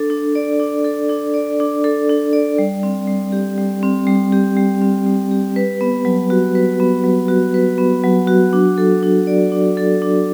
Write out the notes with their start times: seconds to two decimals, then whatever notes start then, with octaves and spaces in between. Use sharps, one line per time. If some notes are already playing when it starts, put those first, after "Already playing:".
Already playing: D4 A4
0.10 D4
0.35 D5
0.60 D4
0.84 A4
1.09 D4
1.34 D5
1.60 D4
1.84 A4
2.09 D4
2.33 D5
2.58 G3
2.83 C4
3.08 G3
3.32 G4
3.58 G3
3.83 C4
4.07 G3
4.32 G4
4.57 G3
4.82 C4
5.06 G3
5.31 G4
5.56 B4
5.81 B3
6.05 F#3
6.30 F#4
6.55 B4
6.80 B3
7.04 F#3
7.28 F#4
7.54 B4
7.78 B3
8.03 F#3
8.27 F#4
8.53 D4
8.78 A4
9.03 D4
9.27 D5
9.52 D4
9.77 A4
10.02 D4